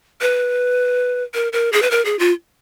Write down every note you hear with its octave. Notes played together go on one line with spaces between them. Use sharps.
B4
A#4
A#4
G#4
B4
A#4
G#4
F4